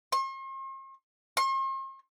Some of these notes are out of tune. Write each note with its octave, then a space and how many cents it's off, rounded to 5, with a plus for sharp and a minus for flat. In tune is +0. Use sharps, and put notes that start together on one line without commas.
C6 +45
C6 +45